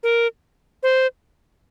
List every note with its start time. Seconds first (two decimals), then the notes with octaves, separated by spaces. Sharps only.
0.03 A#4
0.83 C5